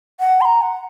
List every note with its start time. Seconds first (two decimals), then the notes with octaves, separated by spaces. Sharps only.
0.20 F#5
0.41 C6
0.45 A#5
0.62 F#5